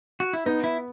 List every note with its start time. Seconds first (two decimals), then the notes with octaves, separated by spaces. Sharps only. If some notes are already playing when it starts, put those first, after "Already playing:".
0.20 F#4
0.33 E4
0.46 B3 D#4
0.64 E4